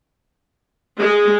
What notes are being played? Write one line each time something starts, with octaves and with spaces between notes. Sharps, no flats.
G#3